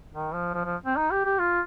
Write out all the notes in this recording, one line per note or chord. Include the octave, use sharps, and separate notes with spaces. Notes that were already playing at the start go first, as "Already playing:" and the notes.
D#3
F3
F3
F3
C4
D#4
G4
G4
F4